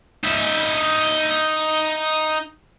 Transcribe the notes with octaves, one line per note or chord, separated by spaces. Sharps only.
D#4 E5